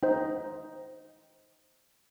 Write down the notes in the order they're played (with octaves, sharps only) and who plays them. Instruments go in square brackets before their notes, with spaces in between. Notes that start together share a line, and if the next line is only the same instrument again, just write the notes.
[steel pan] D#4 [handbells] C5 G5